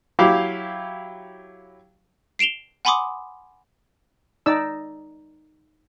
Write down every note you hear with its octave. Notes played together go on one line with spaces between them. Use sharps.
F#3 E4 G4 F5 D6
C7 D7 E7 F7 G7
F#5 G#5 B5 C6 D6 D#6
D#4 D5 E6